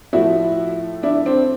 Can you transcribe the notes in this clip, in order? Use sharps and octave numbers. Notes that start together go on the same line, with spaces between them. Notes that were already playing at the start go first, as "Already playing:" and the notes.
A2 F3 A3 E4 F#4
D4 E4
C4 D4